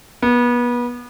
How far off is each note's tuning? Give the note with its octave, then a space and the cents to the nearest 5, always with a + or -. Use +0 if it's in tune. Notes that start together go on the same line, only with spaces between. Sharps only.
B3 -30